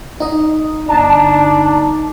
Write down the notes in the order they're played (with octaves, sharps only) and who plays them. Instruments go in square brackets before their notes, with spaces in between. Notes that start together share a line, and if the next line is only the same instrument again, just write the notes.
[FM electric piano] D#4 D#5
[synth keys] G1 A5 A#5 [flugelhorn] D4